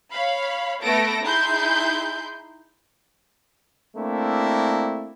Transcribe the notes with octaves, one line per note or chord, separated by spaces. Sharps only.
C#5 F5 B5
A3 B3 A4 A#6 D7
D#4 E4 G#4 C6 G6
A3 A#3 C4 D4 E4